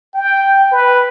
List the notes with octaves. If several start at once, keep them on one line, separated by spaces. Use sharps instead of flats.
G5
B4